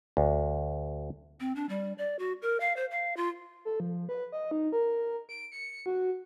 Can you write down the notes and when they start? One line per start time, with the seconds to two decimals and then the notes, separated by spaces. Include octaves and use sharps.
0.17 D2
1.40 C4
1.56 D4
1.69 G3
1.98 D5
2.19 F#4
2.42 A#4
2.60 F5
2.76 C5
2.91 F5
3.17 F4
3.65 A4
3.80 F3
4.09 B4
4.32 D#5
4.51 D#4
4.72 A#4
5.29 D7
5.52 C#7
5.86 F#4